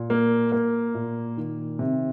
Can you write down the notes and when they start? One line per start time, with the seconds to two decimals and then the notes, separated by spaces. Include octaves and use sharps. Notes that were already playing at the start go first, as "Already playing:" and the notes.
Already playing: A#2
0.10 A#3
0.52 A#3
0.95 A#2
1.37 D#3
1.79 C3